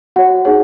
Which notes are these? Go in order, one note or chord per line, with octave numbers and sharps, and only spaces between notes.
F#4 C#5 F#5
D#4 G#4 C#5 F#5